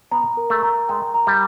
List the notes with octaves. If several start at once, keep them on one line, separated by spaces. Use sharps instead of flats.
B3 A#5
A#4
A3
A#5
G#3 G5
A#5
G3